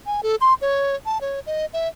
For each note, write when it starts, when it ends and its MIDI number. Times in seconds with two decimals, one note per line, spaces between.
0.06 0.21 80
0.23 0.36 69
0.41 0.54 84
0.61 0.95 73
1.06 1.21 81
1.21 1.40 73
1.46 1.66 75
1.73 1.88 76